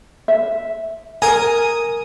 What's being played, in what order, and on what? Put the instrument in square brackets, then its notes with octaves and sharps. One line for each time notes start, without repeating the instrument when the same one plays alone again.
[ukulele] E5
[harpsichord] A#4 A#5 [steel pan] G#5 [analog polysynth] D#6